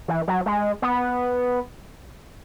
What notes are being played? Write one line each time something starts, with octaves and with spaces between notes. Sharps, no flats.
E3
F#3
G#3
B3